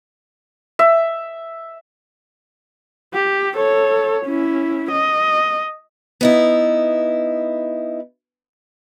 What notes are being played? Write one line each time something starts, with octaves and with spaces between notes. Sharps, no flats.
E5
G4
A4 C#5
C#4 E4
D#5
B3 D#4 E4